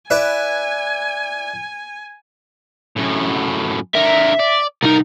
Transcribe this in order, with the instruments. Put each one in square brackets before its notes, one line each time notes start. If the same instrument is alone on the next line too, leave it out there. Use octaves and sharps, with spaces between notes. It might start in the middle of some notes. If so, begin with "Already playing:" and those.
[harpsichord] E4 B4 D5 [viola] G#5
[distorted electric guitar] F#2 A2
[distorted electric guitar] D3 A#4 [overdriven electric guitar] E5
[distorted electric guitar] D5
[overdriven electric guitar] C2 D#4 [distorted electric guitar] A#4